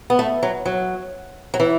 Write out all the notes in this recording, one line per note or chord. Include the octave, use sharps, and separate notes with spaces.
B3
A3
F#3
F#3
F#3
E3